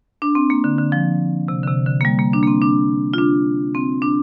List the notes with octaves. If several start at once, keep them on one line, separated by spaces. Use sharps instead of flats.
D4
C4
A#3
D3
D3
F3
C3
D3
C3
D3
A#3
G3
A#3
D4
A#3
C4
D4
F4
D4
C4
D4